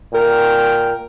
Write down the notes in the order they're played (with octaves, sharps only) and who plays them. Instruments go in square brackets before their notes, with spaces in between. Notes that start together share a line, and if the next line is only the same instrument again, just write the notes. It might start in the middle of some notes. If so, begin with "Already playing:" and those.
[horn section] A#2 A#4 G5